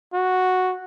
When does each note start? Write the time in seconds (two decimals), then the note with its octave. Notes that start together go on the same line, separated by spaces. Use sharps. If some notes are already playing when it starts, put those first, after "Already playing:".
0.14 F#4